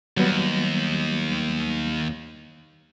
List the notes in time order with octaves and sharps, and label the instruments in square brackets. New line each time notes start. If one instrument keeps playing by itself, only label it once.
[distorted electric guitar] D#2 [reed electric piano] F#3 G3 B3